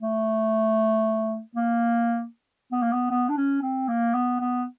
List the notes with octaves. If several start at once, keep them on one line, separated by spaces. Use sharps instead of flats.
A3
A#3
B3
A#3
B3
B3
D4
C#4
C4
A#3
B3
B3